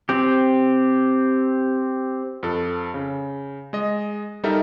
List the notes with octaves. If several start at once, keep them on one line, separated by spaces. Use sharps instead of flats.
C4 G4
F2 A4
C#3
G#3 D#5
G3 D#4 A4 A#4 E5